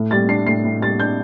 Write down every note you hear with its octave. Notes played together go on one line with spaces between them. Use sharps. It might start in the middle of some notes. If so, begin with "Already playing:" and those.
Already playing: A2
G3 A6
D4 C7
A2 C7
A2
G3 A6
D4 G6